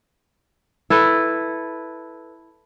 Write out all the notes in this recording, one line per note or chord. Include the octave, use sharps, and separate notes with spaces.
E4 A4 B4